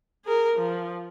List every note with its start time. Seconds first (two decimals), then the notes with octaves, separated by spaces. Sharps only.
0.25 G#4 A#4
0.56 F3